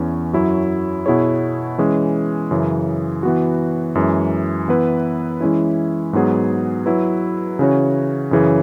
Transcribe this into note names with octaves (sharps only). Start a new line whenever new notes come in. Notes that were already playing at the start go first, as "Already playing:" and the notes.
Already playing: E2 E3 C#4
F#2 F#3 E4 C#5
B2 B3 E4 G#4 C#5
E3 G#3 C#4
F#2 C#3 E3
E3 B3 F#4
F#2 E3 G#3
E3 B3 E4 B4
E3 G#3 C#4 E4
G#2 F#3 B3 G#4
F#3 E4 B4
C#3 E3 C#4 F#4 C#5
F#2 C#3 E3 C#4 G#4